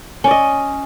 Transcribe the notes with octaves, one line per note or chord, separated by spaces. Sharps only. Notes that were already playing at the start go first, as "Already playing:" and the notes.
C#4 D5 D#5